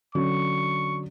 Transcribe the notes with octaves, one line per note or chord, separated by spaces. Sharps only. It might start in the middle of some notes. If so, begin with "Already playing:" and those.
D3 F#3 C#4 C#6